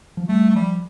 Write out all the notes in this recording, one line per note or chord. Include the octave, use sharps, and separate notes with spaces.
F3
G3 A3
A3
F3 G3